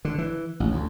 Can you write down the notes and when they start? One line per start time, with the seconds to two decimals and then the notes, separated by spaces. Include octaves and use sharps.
0.05 D3
0.18 E3
0.60 A1
0.72 D2